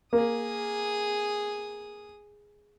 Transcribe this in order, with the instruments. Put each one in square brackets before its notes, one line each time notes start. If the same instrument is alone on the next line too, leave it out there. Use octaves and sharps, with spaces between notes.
[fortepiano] A#3 [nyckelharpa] G#4 D#6